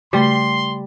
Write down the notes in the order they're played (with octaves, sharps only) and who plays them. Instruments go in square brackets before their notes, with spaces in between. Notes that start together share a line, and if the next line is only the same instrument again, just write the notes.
[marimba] C#3 A3 [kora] G3 [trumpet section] C6